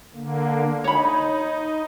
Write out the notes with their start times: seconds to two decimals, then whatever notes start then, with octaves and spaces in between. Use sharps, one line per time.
0.14 D3 A#3
0.84 D#4 C#5 B5